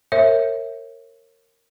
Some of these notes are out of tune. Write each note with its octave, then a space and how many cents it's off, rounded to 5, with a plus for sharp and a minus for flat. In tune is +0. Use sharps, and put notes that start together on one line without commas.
A#4 -25 C#5 -35 E5 +0